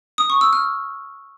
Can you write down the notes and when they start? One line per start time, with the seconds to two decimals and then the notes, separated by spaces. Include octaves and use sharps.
0.18 D#6
0.30 C#6
0.41 E6
0.53 F6